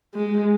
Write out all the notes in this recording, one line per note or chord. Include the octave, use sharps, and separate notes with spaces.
G#3